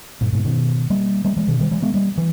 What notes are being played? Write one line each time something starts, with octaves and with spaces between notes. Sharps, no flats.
G2 A#2
G#2 B2
B2 D#3
G3 A#3
G3 A#3
E3 G#3
B2 D#3
D#3 G3
E3 G#3
G#3 B3
G3 A#3
E3